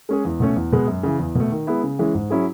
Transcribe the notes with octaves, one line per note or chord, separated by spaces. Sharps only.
G#3 C#4 G#4
E2
B2 A3 C#4
E2
B2 G#3 B3
F#2
C#3 E3
E2
B2 A3
D#3
G#3 B3 E4
C#3
E3 G#3 C#4
G#2
F#3 C#4 E4 G#4